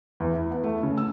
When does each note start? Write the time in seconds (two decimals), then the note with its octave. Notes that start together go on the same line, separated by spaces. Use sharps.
0.20 E2
0.34 E4
0.51 B3
0.64 A3
0.83 C#3
0.98 E6